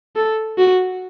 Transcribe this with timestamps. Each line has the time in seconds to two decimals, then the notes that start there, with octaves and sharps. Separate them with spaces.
0.16 A4
0.58 F#4